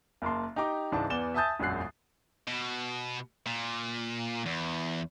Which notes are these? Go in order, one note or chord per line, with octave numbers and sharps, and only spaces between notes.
F#1 A#3 A5 C6
D#4 G4 A#5 D6
C#2 G#2 E3 D4 A5
E2 B3 D5 G#5 E7 G7
E5 G#5 A5 D#6 G6 A6
E1 A#1 F#2 F#3 F#6 C7
B2
A#2
E2